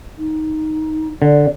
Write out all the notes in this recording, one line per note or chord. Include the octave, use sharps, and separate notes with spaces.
D#4
D3 D5